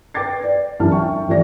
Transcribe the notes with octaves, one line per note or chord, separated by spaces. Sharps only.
B4 G5 D6 A6 C7
D5
C2 F#2 D3 E3 A5 F6
E5 G5 C#6
A1 F3 A3 D5 A#6